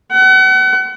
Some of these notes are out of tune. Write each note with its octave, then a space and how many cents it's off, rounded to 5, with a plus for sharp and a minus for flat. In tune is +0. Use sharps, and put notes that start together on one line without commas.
F#5 +35